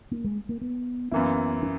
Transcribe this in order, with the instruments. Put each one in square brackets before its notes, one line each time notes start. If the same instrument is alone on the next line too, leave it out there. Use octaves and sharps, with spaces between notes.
[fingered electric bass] A#3
G#3
A#3
B3
[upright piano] F#2 E3 A#3 E4 [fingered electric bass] B3
[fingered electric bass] C#4